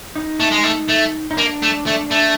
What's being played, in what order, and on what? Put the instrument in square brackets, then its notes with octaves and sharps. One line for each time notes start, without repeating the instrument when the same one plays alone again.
[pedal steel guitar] D#4
[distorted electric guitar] A3
G#3
A3
A3
[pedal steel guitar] D#4
[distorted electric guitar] A#3 [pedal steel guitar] D4
[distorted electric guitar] A3
A3
A3